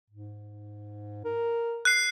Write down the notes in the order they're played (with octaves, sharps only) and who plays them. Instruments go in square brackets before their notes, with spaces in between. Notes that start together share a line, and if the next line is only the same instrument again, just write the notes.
[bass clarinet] G#2
A#4
[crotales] F#6 C7